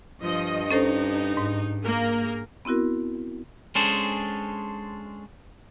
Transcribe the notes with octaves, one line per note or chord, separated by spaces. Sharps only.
G2 F3 D#5
C#4 D#4 A4 C5
G#2
A#3 G#4 A#4
B3 C4 E4 F#4 A#4
G#3 C#4 D4 G#4 A4 C5